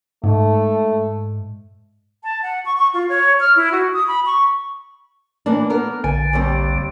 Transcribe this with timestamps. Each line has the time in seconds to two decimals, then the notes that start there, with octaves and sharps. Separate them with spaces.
0.24 G#2 A3
2.24 A5
2.43 F#5
2.66 C#6
2.77 C#6
2.94 F4
3.09 C#5
3.40 F6
3.56 E4
3.72 F#4
3.94 D#6
4.08 B5
4.26 C#6
5.46 E3 A#3 D4
5.70 A#3 B3 A#4
6.04 A#1 D3 G#5
6.33 D#2 G3 C4